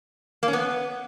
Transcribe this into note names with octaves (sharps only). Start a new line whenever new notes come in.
A#3
C#4
B3